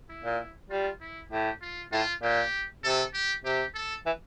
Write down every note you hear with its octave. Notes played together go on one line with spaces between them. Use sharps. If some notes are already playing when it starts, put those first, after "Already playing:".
E4
A#2
G3 F4
E4
A2 G4
F4
A2 F4
A#2 G4
C3 A4
G4
C3 G4
A4
E3